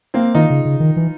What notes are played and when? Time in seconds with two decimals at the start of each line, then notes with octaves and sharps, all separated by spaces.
0.14 A#3 C4
0.34 D#3 D#4 F4
0.50 C#3
0.65 C#3
0.80 D#3
0.96 E3